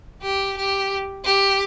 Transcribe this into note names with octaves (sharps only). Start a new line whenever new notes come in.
G4
G4
G4